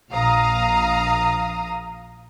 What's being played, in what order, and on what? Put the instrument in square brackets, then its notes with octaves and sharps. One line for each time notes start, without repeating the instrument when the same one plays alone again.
[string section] A#1 F5 A#5 D#6